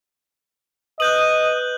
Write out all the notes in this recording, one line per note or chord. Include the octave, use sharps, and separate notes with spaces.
B4 D#5 D#6 F#6 G6 F#7